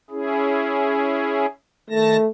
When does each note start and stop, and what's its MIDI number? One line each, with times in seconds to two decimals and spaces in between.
0.11 1.46 61
0.11 1.46 64
0.11 1.46 68
1.90 2.17 51
1.90 2.27 57
1.90 2.17 81
1.90 2.17 94